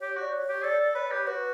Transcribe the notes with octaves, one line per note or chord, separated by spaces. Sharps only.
G4 C#5
F#4
D5
C#5
G4
A4 D5
A4
B4 C#5
G4
F#4 B4